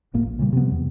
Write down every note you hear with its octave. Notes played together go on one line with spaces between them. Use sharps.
D1 G1 A2 A#3
A#1
A#2 C#3 G3
C3 F3 B3
E2